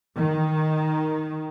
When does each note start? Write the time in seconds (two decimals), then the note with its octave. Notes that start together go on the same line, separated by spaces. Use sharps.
0.18 D#3